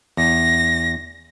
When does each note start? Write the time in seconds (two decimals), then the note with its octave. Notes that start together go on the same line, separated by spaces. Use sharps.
0.17 E2 A#6